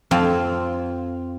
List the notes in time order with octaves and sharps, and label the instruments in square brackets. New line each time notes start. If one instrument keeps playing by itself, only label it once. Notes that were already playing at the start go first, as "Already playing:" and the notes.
[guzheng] F2 C4 F4